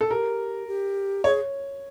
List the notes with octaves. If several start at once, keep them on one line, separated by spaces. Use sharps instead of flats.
A4
G4 A#4
G4
G#4 C#5